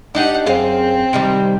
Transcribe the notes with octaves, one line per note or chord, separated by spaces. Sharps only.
D4 D#4 G4 F#5
F#2 C4 G#4 F5
C3 D#3 G3